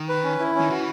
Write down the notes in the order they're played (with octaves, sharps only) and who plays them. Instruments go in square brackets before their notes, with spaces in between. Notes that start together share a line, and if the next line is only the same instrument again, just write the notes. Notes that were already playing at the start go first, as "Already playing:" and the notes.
Already playing: [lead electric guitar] D#3
[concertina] B4
C#4
E4
C#4
[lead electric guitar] D#3
[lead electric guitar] E3 [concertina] F#4